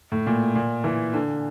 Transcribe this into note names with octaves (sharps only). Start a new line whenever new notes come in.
A2
A#2
A#2
E3
D3